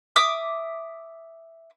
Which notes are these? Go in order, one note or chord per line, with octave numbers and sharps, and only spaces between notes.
E5 D6 D#6